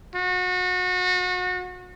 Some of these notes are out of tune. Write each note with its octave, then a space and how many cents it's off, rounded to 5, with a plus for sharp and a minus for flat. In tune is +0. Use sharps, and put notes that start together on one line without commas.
F#4 -30